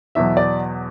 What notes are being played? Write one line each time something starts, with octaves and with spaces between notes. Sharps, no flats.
E2 B2 F#3 E5
D5